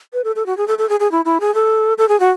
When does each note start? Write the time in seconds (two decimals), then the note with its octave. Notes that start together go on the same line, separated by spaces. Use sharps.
0.13 B4
0.24 A4
0.36 A4
0.46 F#4
0.57 G#4
0.68 A4
0.78 A4
0.89 G#4
1.00 G#4
1.12 E4
1.25 E4
1.40 G#4
1.55 A4
1.98 A4
2.09 G#4
2.20 F#4